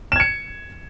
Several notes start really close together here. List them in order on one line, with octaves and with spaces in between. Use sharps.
E7 G#6 C#7